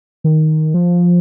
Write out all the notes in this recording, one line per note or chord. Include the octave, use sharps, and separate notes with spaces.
D#3
F3